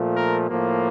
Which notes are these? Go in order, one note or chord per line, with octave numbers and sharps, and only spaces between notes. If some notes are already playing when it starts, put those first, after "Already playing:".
Already playing: A#2 F3 A3
A#4
A2 F3 A#3